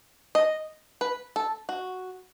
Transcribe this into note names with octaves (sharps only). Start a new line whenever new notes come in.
D#5
B4
A4
F#4